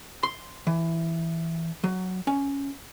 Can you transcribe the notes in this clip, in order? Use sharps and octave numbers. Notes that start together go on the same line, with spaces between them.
C6
E3
F#3
C#4